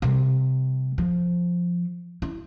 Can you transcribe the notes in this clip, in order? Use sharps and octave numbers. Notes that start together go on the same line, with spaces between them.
C3 G3
F3
E4